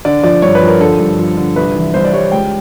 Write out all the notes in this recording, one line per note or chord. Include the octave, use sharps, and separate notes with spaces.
D3 D5
F3 D5
G2 C#5
B4
F3
A#4
D3 A4
G2
F3
D3
C2 B4
E3
C2 C5
D5
G3 C#5
C#2 G5